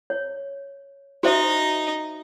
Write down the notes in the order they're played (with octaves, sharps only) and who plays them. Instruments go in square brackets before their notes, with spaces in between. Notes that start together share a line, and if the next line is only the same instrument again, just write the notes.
[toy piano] C#5
[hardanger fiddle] D#4 D#5 [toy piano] F#4 C5 E5